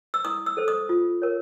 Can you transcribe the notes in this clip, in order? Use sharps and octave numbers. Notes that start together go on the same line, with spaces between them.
E6
E4 D#6
E6
A4 C5
D#6
F4
A#4 C#5